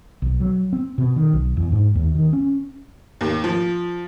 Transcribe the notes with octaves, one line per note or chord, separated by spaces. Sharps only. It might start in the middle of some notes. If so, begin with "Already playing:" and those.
B1
F#3
C4
B2
D#3
B1
E2
G#2
D#2
D#3
C#4
D#2
F3